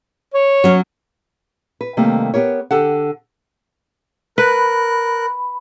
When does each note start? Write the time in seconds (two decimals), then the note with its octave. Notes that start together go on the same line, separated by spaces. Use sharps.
0.34 C#5
0.64 F#3 C#4
1.81 B4
1.97 C3 D#3 G3 A3 A#3
2.34 B3 G4 A#4 C#5
2.71 D3 G4 A4 F#5
4.38 A#4 B4 B5 F#6